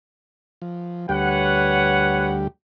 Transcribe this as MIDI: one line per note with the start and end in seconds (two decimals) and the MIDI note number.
0.62 1.07 53
1.09 2.47 38
1.09 2.47 55
1.09 2.47 67
1.09 2.34 71
1.09 2.34 73
1.09 2.34 78